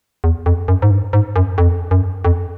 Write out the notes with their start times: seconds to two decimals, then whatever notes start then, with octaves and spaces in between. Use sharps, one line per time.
0.24 E2
0.46 F2
0.68 F#2
0.82 G#2
0.91 G2
1.13 G#2
1.36 F#2
1.58 F2
1.91 F#2
2.25 F2